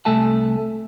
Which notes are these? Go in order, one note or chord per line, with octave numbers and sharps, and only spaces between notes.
C2 A3 A4 E5 G#5 A5